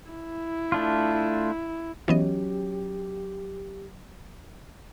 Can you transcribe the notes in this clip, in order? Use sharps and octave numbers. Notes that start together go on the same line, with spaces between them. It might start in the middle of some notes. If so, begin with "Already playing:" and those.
E4
A3 D4 F4
E3 F#3 B3 C#4 G4 D#5